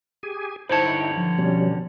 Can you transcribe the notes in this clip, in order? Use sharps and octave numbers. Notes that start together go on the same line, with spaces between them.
G4 G#4 G#5
G2 D3 D#4 E4 C5 C#5 G5 A5
F3
B2 G3 C#4